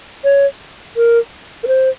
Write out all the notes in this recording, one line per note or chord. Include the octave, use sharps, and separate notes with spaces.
C#5
A#4
A#4
C5